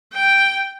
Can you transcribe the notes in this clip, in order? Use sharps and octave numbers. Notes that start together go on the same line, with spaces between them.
G5